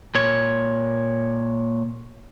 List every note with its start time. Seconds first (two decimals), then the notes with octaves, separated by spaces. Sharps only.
0.15 A#2 C#5